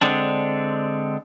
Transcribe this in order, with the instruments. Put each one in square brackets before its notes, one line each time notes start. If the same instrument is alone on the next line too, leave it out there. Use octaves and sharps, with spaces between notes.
[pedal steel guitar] D3 G#3 C4 D4